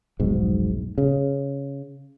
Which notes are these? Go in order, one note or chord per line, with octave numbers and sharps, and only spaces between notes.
F1 B1 G#2
C#3